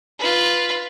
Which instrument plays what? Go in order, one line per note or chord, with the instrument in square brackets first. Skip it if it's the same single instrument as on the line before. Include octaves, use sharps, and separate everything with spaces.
[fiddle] F4 B4